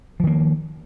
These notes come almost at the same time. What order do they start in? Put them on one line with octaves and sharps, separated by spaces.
F3 D#3 A#3